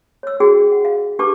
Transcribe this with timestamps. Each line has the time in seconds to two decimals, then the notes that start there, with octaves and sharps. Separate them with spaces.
0.23 C#5 E6
0.40 D4 F#4 G#4 G5
0.72 F#5
0.85 F5
1.19 D4 G4 B4 A5 C#6 D6